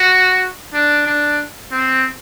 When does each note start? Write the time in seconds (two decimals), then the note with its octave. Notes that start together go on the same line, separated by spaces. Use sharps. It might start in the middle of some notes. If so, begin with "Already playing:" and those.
Already playing: F#4
0.74 D4
1.07 D4
1.72 C4